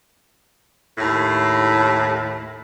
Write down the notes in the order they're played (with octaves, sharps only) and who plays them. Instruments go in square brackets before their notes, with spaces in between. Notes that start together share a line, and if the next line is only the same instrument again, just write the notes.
[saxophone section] D#2 A2